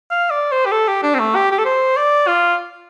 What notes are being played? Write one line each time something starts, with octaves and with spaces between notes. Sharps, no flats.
F5
D5
C5
G4
A4
G4
D4
C4
A3
G4
G4
A4
C5
D5
F4